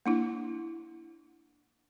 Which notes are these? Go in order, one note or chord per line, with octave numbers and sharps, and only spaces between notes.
A#3 D4 E4